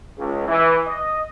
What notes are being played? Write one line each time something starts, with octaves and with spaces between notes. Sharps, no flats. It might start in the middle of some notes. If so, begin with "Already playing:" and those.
C#2
E3
D#5